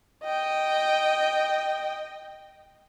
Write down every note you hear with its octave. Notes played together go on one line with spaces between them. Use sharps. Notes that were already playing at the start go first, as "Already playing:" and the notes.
D#5 G5